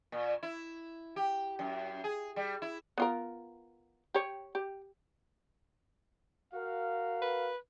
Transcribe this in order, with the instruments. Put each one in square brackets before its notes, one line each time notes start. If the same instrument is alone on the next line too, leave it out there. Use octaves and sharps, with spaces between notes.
[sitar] A#2
E4
G4
F#2
G#4
G3
E4
[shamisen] B3 F4 A#4
G4 C#5
G4
[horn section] F#4 A#4 F5
[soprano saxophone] B4